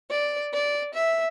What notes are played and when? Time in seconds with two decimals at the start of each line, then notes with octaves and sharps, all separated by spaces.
0.10 D5
0.53 D5
0.94 E5